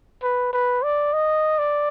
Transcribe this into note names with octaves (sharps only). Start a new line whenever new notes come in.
B4
B4
D5
D#5
D5